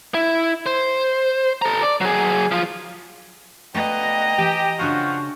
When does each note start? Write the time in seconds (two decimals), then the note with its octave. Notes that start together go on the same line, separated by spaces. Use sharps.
0.14 E4
0.66 C5
1.62 A4 A#5
1.82 D5
2.01 F#3 G#4
2.52 F3 F4
3.74 B2 D3 A3 B4 D#5 F5 G5 A#5
4.38 E3 G4
4.79 C#3 F3 D4 F#4 F#5 C#6